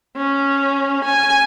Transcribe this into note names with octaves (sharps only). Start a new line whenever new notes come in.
C#4
G#5